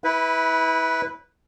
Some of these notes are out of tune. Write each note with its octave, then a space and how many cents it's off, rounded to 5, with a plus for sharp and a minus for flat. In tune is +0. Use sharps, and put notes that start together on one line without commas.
E4 -25 B4 +0